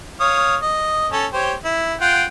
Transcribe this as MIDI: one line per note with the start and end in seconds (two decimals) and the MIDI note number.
0.20 0.56 73
0.20 0.56 77
0.20 0.56 87
0.62 1.07 75
1.12 1.26 61
1.12 1.26 69
1.12 1.26 73
1.33 1.54 67
1.33 1.54 72
1.33 1.54 73
1.65 1.94 64
2.01 2.24 65
2.01 2.24 78
2.01 2.24 79